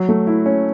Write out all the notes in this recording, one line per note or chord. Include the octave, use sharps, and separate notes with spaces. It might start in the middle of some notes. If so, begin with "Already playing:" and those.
Already playing: F#3
A3
E4
C#4